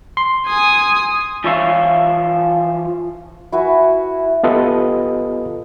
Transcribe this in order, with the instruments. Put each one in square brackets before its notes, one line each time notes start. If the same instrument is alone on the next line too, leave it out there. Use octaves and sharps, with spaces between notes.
[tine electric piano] C6
[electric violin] G#5 D#6
[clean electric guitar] E3 F3 C#5 E5 F5
[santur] E4 F#4 B4 G#5
[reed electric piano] B3 F4 G4 A4 B4 D#5